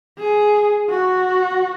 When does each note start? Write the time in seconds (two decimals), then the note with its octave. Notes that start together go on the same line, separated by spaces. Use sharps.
0.19 G#4
0.90 F#4